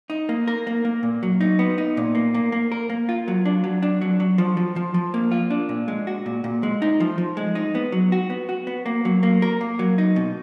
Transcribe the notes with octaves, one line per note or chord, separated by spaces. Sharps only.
D#4
A#3
A#4
A#3
A#3
A#2
F#3
D#4
B3
D#4
A#2
A#3
A#3
A#3
A#4
A#3
F4
F#3
D4
F#3
D4
F#3
F#3
F3
F3
F3
F3
A#3
F4
D4
A#2
G#3
F#4
A#2
A#2
G#3
D#4
F3
F3
G#3
D#4
B3
F#3
F#4
B3
F#4
B3
A#3
F#3
A#3
A#4
A#3
F#3
D#4
B2